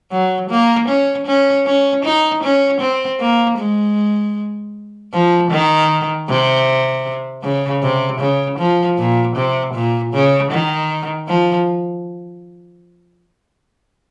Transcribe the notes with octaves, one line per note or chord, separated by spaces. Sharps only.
F#3
A#3
C#4
C#4
C#4
D#4
C#4
C4
A#3
G#3
F3
D#3
C3
C#3
C3
C#3
F3
A#2
C3
A#2
C#3
D#3
F3